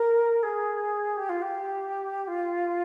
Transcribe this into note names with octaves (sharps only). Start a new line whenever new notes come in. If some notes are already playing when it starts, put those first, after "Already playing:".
Already playing: A#4
G#4
G4
F4
G4
F4